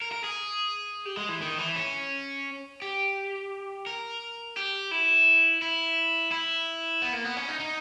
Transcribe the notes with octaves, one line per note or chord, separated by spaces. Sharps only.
A#4
A#4
G#4
G4
G#3
E3
D#3
E3
C#4
G4
A#4
G4
E4
E4
E4
B3
A#3
B3
C#4
D#4
D#4